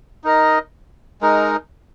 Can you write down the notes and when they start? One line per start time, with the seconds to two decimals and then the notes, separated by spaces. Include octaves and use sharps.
0.24 D#4 A#4 D#5
1.21 G#3 D#4 A#4